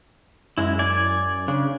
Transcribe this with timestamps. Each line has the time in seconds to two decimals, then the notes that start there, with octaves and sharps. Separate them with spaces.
0.58 F#2 G#3 E4
0.79 D5 G#5
1.48 C#3 D4